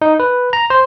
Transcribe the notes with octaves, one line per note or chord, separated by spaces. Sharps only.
D#4
B4
A#5
C5